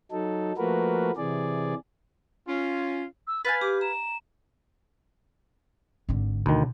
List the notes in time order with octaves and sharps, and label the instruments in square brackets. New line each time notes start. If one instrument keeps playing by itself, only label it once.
[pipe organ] F#3 D#4 A4
F3 A3 A#3 F#4 A#4 B4
C3 E3 G#4 D5
[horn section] C#4 F4
[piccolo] E6
[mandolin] B4 F5 G#5 [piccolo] A6
[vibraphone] G4 [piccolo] D6
[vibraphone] A#5 [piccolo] E7
[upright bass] G#1 D3
[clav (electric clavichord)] D2 D#3 [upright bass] B2